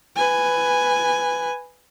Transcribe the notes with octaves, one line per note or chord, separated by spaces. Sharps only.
B4 G#5